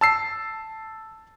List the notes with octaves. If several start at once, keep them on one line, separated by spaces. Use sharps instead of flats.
A5 E6 C7